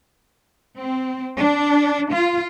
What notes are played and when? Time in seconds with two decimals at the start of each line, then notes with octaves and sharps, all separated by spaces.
0.78 C4
1.40 D4
2.13 F4